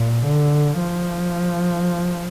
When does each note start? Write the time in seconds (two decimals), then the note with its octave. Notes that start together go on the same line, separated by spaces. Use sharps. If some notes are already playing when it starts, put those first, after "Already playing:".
Already playing: A#2
0.25 D3
0.79 F3